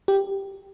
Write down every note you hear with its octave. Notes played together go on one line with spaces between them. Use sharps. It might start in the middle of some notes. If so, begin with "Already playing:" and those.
G4